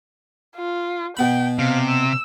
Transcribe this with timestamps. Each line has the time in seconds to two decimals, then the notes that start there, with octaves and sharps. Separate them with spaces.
0.56 F4
1.17 B2 B3 G5 B5
1.59 C3 F5
1.89 E6